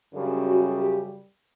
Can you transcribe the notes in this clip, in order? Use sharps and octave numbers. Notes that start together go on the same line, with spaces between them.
F#2 C#3 G3 D4
F#4
G4